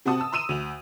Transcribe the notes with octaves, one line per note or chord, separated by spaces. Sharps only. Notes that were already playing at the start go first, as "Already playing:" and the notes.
C3 C4 F#4 F#5 A5 D#6
A5 E6
A#5 C6 E6 D#7 E7
D2 F7